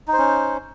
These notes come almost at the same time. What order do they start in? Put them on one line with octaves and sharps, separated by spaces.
D#4 C5 C#4